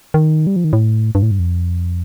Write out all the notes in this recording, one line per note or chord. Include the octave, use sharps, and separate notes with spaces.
D#3
G3
F3
D#3
A2
G2
A2
G2
F2